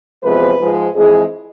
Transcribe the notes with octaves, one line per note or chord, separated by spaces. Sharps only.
E2 C3 F3 G#3 B4
G#2 F3 G#3
F2 E3 G#3 G#4